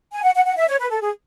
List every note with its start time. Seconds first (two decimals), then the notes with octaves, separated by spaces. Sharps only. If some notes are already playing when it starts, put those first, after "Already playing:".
0.13 G#5
0.23 F#5
0.35 F#5
0.45 F#5
0.56 E5
0.68 C#5
0.79 B4
0.90 A4
1.01 G#4